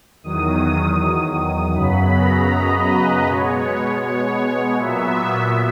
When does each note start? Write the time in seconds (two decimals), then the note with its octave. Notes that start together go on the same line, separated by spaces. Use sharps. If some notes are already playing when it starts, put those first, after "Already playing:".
0.23 E2 D#3 F#3 D#6
1.75 F#2 C#3 F#3 B3 B5
2.13 A#5
2.50 D#5
2.89 B4
3.27 B2 G#3 B3 C#5
4.02 C#5
4.78 A#2 F#3 B3 E5